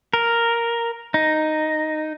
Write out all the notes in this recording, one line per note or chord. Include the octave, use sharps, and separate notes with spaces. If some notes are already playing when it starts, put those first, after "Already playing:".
A#4
D#4